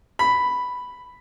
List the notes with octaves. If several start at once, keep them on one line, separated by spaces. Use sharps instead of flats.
B5